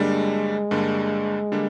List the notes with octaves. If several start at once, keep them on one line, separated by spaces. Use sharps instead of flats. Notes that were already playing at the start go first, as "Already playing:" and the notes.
Already playing: G2 D3 G3 G#3 A#3 D4
G2 D3 G3 A#3 D4
D3 G3 A#3 D4